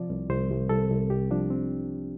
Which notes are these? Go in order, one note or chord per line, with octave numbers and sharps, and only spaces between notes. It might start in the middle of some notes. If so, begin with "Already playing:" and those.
Already playing: C3 F3 D5
C2
C2 C5
C2
C2 A4
C2
C2 G4
F3 D4
C4